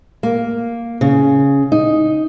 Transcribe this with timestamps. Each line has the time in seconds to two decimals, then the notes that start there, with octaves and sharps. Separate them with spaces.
0.23 A#3
1.01 C#3
1.72 D#4